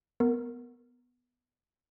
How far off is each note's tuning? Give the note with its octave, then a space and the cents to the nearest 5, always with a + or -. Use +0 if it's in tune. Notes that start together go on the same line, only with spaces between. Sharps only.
B3 +0 A#4 +0